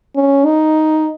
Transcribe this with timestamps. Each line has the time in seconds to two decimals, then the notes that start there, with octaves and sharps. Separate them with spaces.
0.16 C#4
0.46 D#4